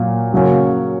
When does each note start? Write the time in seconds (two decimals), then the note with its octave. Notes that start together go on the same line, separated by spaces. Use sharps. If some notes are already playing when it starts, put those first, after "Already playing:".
Already playing: A#2 F#3 A#3
0.33 C#3 F#3 A#3 C#4